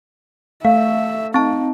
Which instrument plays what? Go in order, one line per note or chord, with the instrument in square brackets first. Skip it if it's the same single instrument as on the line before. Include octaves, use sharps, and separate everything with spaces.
[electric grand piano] A3 [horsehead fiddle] E5 [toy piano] F5
[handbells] C4 A5 [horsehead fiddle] D#4